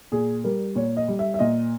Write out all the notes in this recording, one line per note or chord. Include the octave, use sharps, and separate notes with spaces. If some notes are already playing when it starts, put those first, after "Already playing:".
A#2 G#4
G3 A#4
A#2 C#5
D#5
G3
E5
E5
A#2 D#5